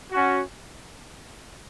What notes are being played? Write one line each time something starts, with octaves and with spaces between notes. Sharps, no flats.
C#4 F#4